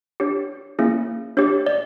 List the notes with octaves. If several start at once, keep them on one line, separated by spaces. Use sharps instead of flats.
D4 G4 C#5
A#3 C#4 E4 G#4
D4 G4 C#5
D5